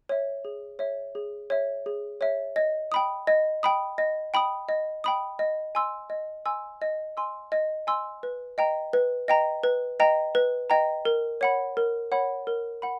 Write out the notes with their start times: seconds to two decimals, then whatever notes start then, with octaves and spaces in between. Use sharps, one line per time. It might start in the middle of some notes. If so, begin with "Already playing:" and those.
0.09 C#5 E5
0.45 G#4
0.79 C#5 E5
1.15 G#4
1.50 C#5 E5
1.86 G#4
2.21 C#5 E5
2.56 D#5
2.92 G5 B5 D#6
3.27 D#5
3.63 G5 B5 D#6
3.98 D#5
4.34 G5 B5 D#6
4.69 D#5
5.04 G5 B5 D#6
5.39 D#5
5.75 G#5 C6 E6
6.10 D#5
6.46 G#5 C6 E6
6.82 D#5
7.17 G#5 C6 E6
7.52 D#5
7.87 G#5 C6 E6
8.23 B4
8.58 D#5 G5 A#5
8.93 B4
9.28 D#5 G5 A#5
9.63 B4
10.00 D#5 G5 A#5
10.35 B4
10.70 D#5 G5 A#5
11.05 A#4
11.41 C#5 F#5 B5
11.77 A#4
12.12 C#5 F#5 B5
12.47 A#4
12.82 F#5 B5